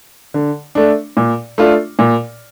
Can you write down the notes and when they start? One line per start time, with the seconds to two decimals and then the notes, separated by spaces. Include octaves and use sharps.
0.34 D3
0.75 A3 D4
1.17 A#2
1.58 A3 D4 F4
1.99 A#2